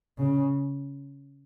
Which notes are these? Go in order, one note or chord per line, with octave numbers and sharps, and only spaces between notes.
C#3